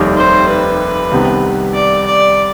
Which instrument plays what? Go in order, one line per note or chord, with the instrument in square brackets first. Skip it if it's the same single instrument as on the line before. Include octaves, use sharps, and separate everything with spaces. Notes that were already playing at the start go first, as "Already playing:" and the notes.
Already playing: [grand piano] F1 D#2 D#3 G3
[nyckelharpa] C5
B4
[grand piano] C2 C3 D#3 B3
[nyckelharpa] D5
D5